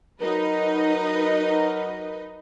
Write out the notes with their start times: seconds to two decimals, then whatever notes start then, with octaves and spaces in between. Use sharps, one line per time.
0.21 F#3 D#4 A#4 B4 D#5